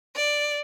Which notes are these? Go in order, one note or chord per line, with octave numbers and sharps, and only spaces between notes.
D5